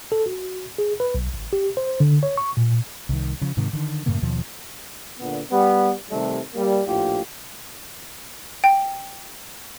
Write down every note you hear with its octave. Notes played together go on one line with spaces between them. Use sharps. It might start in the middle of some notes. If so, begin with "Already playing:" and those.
A4
F#4
G#4
B4
B1
G#1
G4
C5
D3
C#5
C#6
A#2
C2 D#3
C#3 F3
G#2 C3 D#3
D3 D#3
F#2 A2 C#3 A#3
D#2 B2 F3
A#2 D3 B3
G3 B3
C3 D#3 G3 A3
G3 A#3
A#1 A2 F4 G4
G5